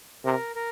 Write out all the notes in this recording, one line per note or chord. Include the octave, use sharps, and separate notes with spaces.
C3 A#4
A#4